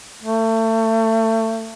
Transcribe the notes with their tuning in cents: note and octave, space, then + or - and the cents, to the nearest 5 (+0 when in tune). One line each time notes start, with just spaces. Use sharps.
A3 +30